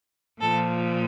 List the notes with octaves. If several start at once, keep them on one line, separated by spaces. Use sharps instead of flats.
A#2 F3 A4